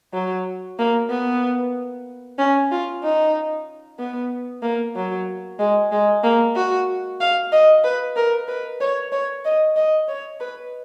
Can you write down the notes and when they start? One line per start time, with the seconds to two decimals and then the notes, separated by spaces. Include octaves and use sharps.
0.13 F#3
0.79 A#3
1.10 B3
2.38 C#4
2.71 F4
3.03 D#4
3.99 B3
4.62 A#3
4.96 F#3
5.59 G#3
5.91 G#3
6.24 A#3
6.56 F#4
7.20 F5
7.52 D#5
7.84 B4
8.16 A#4
8.48 B4
8.81 C#5
9.12 C#5
9.45 D#5
9.76 D#5
10.08 C#5
10.40 B4